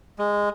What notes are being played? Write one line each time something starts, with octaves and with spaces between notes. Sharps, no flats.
G#3